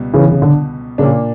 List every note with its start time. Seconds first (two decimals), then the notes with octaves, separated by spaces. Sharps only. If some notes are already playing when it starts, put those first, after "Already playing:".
Already playing: C#2 B2 G3 B3
0.13 C#3 E3
0.31 C#3
0.42 D3
0.98 A#2 C#3 A#3 D4